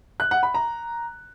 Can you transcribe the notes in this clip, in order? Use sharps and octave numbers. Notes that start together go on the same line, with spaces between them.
F#6
F#5
B5
A#5